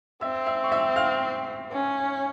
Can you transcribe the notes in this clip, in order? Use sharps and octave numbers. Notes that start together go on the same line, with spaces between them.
C4 E5 E6
E5 E6
C#6
E5 E6
F5 F6
C#4